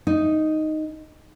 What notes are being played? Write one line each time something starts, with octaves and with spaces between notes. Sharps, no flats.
D#4